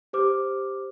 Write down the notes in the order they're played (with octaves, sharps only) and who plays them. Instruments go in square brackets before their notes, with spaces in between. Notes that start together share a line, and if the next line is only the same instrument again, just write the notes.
[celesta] G4 C5 D6 F6